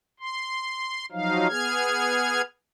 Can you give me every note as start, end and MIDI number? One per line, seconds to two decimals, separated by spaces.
0.20 1.06 84
1.12 1.47 53
1.12 1.47 54
1.12 1.47 63
1.12 1.47 77
1.48 2.42 59
1.48 2.42 68
1.48 2.42 89
1.48 2.42 92